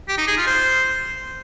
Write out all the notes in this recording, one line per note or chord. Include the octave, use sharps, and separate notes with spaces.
G4
D#4
G#4
F4
C5